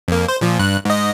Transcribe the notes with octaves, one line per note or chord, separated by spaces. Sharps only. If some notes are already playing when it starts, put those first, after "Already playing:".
F2 A#3
C5
A#2 F3
G2 F#6
G#2 D#5